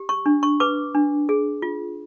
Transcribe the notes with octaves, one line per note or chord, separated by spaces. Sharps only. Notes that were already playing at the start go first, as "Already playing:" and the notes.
Already playing: G4
C#6
D4
C#6
B4 D6
D4
G#4
F4